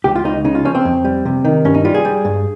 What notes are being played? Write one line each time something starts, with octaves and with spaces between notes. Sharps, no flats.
C#2 G4
F4
C#2 D#4
C#3 D#4
F4
F3 C#4
C4
F2
G3
C3
D#3
G2 C#4
D#4
G3 F4
G#4
G3
G2